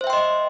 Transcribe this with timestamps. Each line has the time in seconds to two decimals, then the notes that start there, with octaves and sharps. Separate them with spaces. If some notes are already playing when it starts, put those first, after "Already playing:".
0.01 C5
0.04 E5
0.07 G5
0.10 C6
0.13 D#5